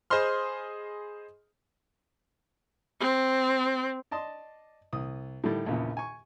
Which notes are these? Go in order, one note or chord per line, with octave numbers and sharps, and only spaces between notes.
G#4 C5 D#5 B5 C6 F6
C4
D5 D#5 A5 C6 D#6
C2 D#6
A2 D3 D#3 G3
A#1 E2 A#2 C#3
G#5 C#6